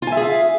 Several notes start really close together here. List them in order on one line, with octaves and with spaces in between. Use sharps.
F4 G#5 E5 G#4 F5